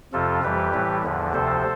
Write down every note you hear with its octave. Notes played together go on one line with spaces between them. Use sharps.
F2 C3 F3 F4 A4
F2 E3 G3 G4 B4
A2 E3 G3
E2 D3 F3
D2 C3 F3 A4 C5